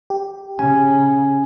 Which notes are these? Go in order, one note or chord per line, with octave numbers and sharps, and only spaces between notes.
G4
C#3 C#4 G#5